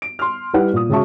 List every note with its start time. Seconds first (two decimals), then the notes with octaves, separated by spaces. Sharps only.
0.02 D7
0.19 C6 F6
0.53 G3 E4 B4 F#5
0.73 A#2 D#6
0.89 C#3 G#3 F#4 E5 A5 C#6